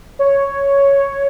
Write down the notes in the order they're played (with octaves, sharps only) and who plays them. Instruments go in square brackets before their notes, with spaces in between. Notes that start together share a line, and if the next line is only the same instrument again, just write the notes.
[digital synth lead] C#5